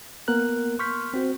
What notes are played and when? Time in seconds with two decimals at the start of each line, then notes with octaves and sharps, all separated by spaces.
0.28 A#3 B3 A#4 F#6
0.79 C6 C#6 F6 G6 B6
1.14 C4 F#4 C5